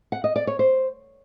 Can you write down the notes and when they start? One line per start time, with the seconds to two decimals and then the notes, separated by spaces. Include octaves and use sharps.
0.12 F#5
0.24 D#5
0.36 D5
0.47 C#5
0.59 C5